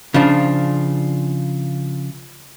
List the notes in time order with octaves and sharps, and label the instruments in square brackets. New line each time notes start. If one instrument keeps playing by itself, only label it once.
[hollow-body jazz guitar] C#3 F3 D4